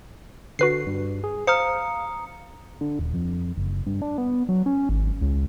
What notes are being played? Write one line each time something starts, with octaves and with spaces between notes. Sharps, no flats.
D3 F#4 B4 C7
G2
G#4
C5 F5 A#5 D#6 F6 C#7
D3
D#1
F2
F#1
G2
D4
B3
F#3
C#4
G#1
C#2